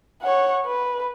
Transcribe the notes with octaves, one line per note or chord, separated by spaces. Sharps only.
C#5 F#5
B4